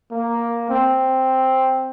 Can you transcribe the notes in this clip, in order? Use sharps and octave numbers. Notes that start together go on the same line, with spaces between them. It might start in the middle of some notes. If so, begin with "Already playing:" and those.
A#3
C4